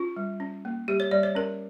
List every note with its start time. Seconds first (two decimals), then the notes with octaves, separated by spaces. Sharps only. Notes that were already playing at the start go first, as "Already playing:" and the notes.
Already playing: C#4 F4
0.16 G3
0.40 C#4
0.65 A#3
0.88 G3 G4
1.00 C#5
1.11 G3 D5
1.23 C#5
1.35 C#4 A#4